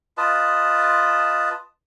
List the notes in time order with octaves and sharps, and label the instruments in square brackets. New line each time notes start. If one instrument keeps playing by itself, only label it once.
[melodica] F4 B4 D#5 A5